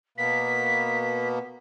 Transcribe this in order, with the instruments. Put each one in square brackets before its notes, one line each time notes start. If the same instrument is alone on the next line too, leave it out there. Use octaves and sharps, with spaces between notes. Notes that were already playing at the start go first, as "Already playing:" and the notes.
[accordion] B2 A#3 B3 [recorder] B6